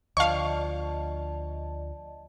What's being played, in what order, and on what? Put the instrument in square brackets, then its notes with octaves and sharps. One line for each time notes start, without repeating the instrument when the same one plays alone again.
[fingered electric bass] D2 F3 [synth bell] D5 D#5 A5 [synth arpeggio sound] F5 C#6